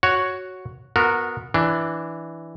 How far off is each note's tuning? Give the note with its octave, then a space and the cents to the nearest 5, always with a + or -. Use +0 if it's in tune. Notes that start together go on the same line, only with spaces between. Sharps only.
F#4 +0 C#5 +0 F#5 +0
B3 +0 F#4 -25 A#4 -10
E3 +0 D4 +0